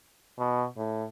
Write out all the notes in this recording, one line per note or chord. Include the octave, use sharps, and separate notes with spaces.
B2
A2